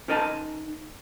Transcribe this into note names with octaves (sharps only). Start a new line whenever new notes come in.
C#4 D#4 A#4 D#5 G#5 A5